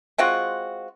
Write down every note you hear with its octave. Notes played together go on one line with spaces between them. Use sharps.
G#3 C4 F4 F#4